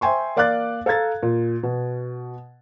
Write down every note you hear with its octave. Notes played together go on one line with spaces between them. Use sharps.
C5 E5 G5 G#5 C6 C#6
A#3 D5 F5 D6 F#6 A6
A4 F5 A#5 G#6 A6
A#2
B2